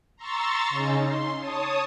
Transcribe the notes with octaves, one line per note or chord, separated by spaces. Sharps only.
A#5 C6 C#6 E6 A6
C#3 C#4 D#4
C6
C#5 A5 D#6